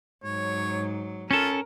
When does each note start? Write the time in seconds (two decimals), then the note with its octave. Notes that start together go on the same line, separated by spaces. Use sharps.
0.24 G#2 F#3 C#5
1.31 C#4 F4 A4 A#4